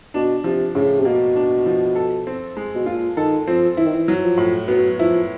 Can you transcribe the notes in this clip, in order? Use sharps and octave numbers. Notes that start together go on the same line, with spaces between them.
B2 D4
C3 F3
A2 C#3
C3
B2 A#3
D4
F3
A4
C4
G#3
B2
A#2 F4
D#3 A4
F3 C4
E3 E4
D#3
E3
F#3
F3
A2
F#3 B3
F3 E4